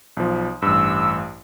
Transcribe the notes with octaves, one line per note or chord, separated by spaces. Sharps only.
B1 F3
A1 G2 E6